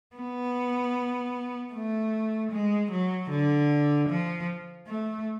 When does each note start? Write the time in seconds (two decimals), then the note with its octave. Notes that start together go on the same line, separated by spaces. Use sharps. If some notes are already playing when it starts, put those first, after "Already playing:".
0.16 B3
1.73 A3
2.51 G#3
2.91 F#3
3.30 D3
4.08 F3
4.87 A3